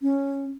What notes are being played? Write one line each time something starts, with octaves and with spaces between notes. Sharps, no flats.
C#4